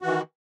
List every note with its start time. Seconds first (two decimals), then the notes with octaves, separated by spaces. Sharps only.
0.02 F#4
0.04 E3
0.07 D#3